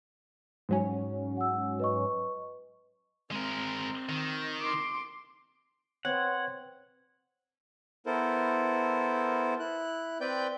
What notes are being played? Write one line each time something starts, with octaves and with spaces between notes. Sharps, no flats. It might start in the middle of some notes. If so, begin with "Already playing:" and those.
G#2 F#3 C#4
F#5 E6
B4 D#5 C#6
G#3 C4 A#4
D#3
C6 D6
C4 B4 C#5 F#5 G#6
B3 E4 A4 A#4 C5
E4 F#6
C4 B4 D5 G5 G6